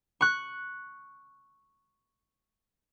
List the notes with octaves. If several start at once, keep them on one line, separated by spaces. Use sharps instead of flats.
C#6 F#6